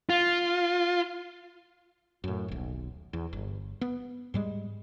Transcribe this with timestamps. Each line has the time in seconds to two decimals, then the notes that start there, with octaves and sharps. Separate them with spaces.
0.09 F4
2.24 F#2 A2
2.48 D#1 B1
3.13 E2
3.33 G1
3.81 B3
4.34 G#2 G3 G#3